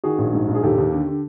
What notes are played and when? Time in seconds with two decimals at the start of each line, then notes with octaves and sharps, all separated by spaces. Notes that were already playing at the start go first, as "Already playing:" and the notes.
0.04 D#3 F#4 G#4
0.18 A#1
0.33 G#2
0.48 A#1
0.54 G#4
0.63 D#2 G4 A4
0.78 D#2
0.93 D3
1.08 D3